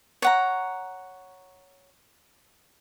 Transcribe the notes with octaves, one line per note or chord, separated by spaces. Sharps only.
C#5 F#5 A#5